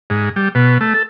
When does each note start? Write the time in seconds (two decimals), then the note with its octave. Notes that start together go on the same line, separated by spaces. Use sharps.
0.10 G#2
0.36 G3
0.55 B2
0.81 A3
0.94 A4